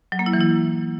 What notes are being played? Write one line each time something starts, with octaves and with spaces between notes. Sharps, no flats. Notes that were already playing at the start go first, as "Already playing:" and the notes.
F#3
A#3
E4
E3
E4